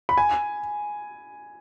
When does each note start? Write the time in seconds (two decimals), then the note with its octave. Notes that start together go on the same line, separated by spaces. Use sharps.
0.09 B5
0.18 G#5